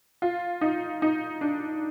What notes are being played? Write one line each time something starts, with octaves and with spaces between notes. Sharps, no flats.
F4
D#4
D#4
D4